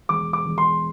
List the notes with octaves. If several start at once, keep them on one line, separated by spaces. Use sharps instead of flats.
E1 D6
D6
E1
C6